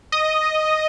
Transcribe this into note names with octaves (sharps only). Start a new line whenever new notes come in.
D#5